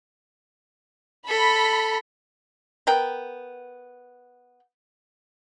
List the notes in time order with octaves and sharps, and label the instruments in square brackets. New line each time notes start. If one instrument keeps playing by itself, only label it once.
[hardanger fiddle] A4 [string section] B5
[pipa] B3 A#4 G5